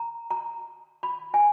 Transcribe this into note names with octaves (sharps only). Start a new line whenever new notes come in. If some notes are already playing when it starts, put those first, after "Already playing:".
Already playing: A#5
A#5
B5
G#5